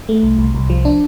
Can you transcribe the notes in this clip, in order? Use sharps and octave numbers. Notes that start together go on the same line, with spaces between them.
A3
C2
C2
C2
F3
D4